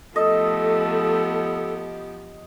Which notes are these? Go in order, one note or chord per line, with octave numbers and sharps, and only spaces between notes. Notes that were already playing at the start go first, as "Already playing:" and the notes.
F3 A3 B3 G4 A4 D#5